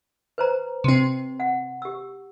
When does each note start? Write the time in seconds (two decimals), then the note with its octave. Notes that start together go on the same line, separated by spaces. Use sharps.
0.38 B4 C5 A#5
0.84 C3 C4
1.40 F#5
1.82 G4 E6